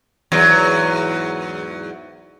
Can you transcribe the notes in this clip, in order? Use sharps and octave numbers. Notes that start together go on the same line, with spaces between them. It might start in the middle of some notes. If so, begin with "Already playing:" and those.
E2 G#2 F#3